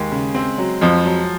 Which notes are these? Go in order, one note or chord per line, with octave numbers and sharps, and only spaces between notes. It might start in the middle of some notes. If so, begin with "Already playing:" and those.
Already playing: D#2 G#3
C#3
C4
F#3
F2 F3
F#3